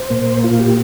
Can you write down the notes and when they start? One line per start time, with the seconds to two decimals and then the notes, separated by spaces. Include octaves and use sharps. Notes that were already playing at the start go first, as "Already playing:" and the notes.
Already playing: C5
0.10 A#2 A#3
0.44 F4
0.60 G4